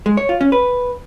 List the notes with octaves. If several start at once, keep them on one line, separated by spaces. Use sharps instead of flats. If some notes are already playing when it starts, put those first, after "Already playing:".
G#3
C#5
F4
C#4
B4